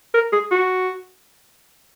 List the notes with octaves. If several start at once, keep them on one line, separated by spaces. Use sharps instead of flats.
A#4
G#4
F#4